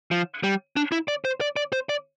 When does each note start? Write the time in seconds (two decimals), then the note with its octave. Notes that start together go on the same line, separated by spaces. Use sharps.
0.11 F3
0.43 G3
0.77 D4
0.92 E4
1.08 D5
1.25 C5
1.41 D5
1.56 D5
1.73 C5
1.89 D5